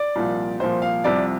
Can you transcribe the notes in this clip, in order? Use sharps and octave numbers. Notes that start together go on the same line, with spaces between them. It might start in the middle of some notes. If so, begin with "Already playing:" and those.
Already playing: D5
C2 A#2 F3
C2 A#2 F3 C5
F5
C2 C3 F3 D5